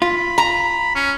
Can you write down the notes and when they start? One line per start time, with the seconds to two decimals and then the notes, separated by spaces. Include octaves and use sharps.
0.02 F4 B5
0.38 A#5
0.95 C#4